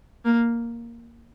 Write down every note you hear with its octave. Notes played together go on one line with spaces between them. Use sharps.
A#3